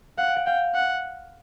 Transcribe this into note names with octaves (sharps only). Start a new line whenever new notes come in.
F5 F#5
G5
F#5
F5 G5
F#5